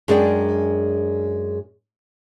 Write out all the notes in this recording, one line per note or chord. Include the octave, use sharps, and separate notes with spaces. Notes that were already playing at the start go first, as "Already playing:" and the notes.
F#2 G#3 D4 G#4 D5 G5